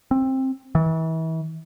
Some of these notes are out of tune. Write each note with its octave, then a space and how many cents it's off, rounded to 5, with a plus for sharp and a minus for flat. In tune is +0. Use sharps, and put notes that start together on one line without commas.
C4 +15
E3 -35